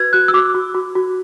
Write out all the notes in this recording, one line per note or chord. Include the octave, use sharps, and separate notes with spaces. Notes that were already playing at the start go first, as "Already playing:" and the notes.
Already playing: F#4 B4 G#6
F#4 F#6
E6
F#4 D6
F#4
F#4
F#4